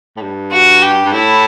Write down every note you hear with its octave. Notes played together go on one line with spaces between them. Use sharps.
A2
G2
F#4
G4
G2
A2 E4